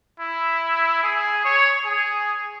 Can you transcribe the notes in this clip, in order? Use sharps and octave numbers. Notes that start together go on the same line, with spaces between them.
E4
G#4
C#5
G#4